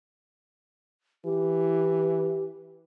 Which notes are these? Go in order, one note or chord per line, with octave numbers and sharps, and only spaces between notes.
E3 G4